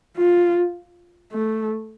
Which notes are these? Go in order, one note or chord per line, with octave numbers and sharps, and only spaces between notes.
F4
A3